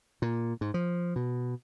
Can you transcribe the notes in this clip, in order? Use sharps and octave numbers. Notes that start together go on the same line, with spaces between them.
A#2
G#2
F3
B2